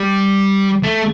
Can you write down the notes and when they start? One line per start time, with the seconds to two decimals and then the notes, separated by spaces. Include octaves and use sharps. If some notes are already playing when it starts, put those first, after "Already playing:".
Already playing: G3
0.84 A3